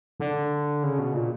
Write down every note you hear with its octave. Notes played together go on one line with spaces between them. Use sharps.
D3
C#3
B2
A#2